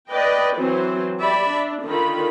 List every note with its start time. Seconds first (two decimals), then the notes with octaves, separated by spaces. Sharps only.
0.11 B4 D5 D#5 G5
0.56 E3 F#3 C4 C5
1.19 G4 D5 E5 B5
1.50 D4
1.85 D3 D#3 F4 B5